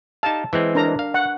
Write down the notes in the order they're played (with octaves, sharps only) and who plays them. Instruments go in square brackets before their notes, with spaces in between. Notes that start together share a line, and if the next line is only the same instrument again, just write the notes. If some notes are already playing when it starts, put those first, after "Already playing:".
[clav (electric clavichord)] D#4 G4 F5 [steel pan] A5
[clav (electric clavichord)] E3 G#3 C4
[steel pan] D4 A#4 A#5
[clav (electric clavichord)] F5
[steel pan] F#5